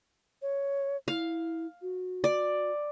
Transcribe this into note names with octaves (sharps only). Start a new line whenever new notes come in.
C#5
E4 F5
F#4
D5